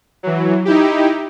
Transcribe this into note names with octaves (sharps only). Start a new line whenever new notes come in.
E3 F#3
D#4 E4 G4